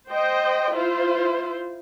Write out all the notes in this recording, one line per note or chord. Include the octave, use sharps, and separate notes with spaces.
C5 D#5 G5
E4 F4 C5